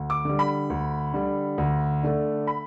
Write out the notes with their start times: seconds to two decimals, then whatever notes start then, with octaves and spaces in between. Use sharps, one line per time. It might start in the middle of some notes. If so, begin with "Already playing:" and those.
Already playing: D2
0.10 D6
0.25 D3 G3
0.39 B5
0.70 D2
1.13 D3 G3
1.58 D2
2.03 D3 A3 D4
2.47 B5